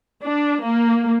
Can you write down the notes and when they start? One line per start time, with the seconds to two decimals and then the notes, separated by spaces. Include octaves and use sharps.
0.22 D4
0.63 A#3